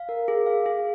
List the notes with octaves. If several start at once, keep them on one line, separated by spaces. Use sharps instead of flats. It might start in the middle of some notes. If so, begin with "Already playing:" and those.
Already playing: F5
A#4
G#4
F5
G#4